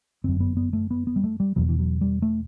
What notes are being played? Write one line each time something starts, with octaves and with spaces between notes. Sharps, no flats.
G1 F#2 C4
B3
B3
A3
B3
B3
G3
A3
G3
E1 E2 B2 F#3
E3
F#3
G3
A3